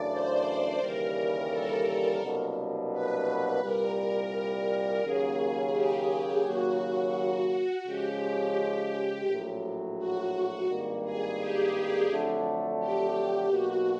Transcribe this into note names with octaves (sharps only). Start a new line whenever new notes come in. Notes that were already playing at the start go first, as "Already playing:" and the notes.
Already playing: F#2 C#3 E3 A3 D4 D5
C5
D#2 C#3 E3 G3 A#4
A4
C2 B2 F#3 A#3 D4
B4
C2 A#2 G3 A#4
D#2 C#3 F#3 A#3 C#4 G#4
G4
D#2 C#3 F#3 A#3 F#4
F#4
C#3 F3 G#3 C#4 G4
A#1 A2 F#3
F#4
G#1 G2 D#3 G3 A#3
G#4
G4
F2 D3 F#3 A3 D4
G4
B1 B2 F#3 A#3 F#4